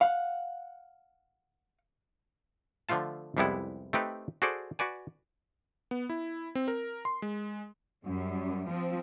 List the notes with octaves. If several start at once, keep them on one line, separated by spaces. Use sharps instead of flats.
F5 F#5
D3 F3 A3 F4 A5
C2 F2 G3 G#3 B3 E4
A3 C4 D#4 G4 B4
F#4 G#4 A4 C5 D5
F#4 B4 D5 G#5
B3
E4
C4
A#4
C6
G#3
F#2 G3
F3 C4